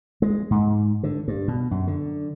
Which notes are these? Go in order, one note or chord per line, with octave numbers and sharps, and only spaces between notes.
G#3
G#2
D3
G2
B2
F#2
D3